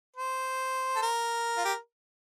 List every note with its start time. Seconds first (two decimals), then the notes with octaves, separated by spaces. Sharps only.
0.16 C5
0.96 A4
1.02 A#4
1.57 F4
1.65 G4